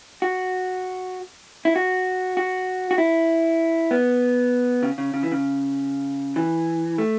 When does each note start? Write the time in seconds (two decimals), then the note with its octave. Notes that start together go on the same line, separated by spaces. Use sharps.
0.22 F#4
1.65 E4
1.76 F#4
2.37 F#4
2.91 F#4
2.98 E4
3.91 B3
4.83 C#3
4.98 C#3
5.14 C#3
5.23 E3
5.32 C#3
6.36 E3
6.98 A3